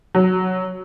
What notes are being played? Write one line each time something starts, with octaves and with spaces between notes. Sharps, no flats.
F#3